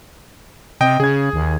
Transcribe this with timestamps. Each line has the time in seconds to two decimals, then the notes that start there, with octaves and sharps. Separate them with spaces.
0.81 C3 D#5 G5
1.00 C#3 G#4 G#6
1.33 D#2